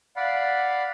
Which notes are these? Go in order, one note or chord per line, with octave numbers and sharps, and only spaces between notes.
D5 F5 F#5 B5